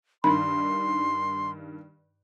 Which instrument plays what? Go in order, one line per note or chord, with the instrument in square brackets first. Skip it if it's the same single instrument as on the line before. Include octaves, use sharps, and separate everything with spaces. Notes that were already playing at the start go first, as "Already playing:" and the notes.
[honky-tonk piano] G2 D#3 [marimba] B5 [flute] C6